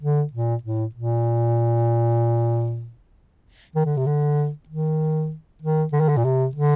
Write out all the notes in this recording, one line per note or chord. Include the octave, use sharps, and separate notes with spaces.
D3
A#2
A2
A#2
D#3
D3
C3
D3
D#3
D#3
D3
D#3
D3
A#2
C3
D3